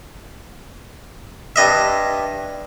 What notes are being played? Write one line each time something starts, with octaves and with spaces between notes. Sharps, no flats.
G2 D#5 E5